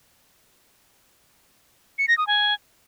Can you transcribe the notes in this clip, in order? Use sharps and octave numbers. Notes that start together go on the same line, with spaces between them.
C#7
A#6
D#6
G#5